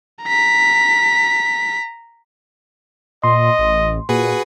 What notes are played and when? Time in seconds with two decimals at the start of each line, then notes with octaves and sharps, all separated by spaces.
0.23 A#5 B6
3.24 A#2 D#5 C6
3.59 A1
4.09 A#2 F#4 G#4 B4